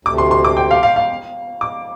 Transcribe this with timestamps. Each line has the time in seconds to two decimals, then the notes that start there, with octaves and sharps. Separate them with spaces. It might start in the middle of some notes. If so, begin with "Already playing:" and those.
0.05 D2 C3 A3 D6
0.18 C6
0.31 C6
0.45 D6
0.57 G5
0.71 F5
0.83 F5
0.96 F5
1.61 D6